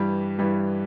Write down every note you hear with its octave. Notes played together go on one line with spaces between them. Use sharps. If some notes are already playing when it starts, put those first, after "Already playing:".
Already playing: G2 E3 G3
G2 E3 G3